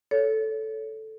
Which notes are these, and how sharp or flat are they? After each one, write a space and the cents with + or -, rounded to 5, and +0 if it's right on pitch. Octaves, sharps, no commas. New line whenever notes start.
A4 -5 C#5 +20